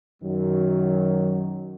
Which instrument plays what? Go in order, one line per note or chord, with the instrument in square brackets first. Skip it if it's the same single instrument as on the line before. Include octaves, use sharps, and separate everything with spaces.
[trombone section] F#2 D#3 F#3